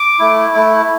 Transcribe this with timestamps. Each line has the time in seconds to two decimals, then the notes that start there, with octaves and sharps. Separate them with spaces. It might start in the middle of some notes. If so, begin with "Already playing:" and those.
Already playing: D6
0.19 A3 E4
0.54 A3 E4